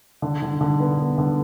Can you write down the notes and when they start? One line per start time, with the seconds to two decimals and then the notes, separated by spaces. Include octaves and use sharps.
0.22 D3
0.42 D3
0.61 D3
0.80 B3
0.99 B3
1.18 D3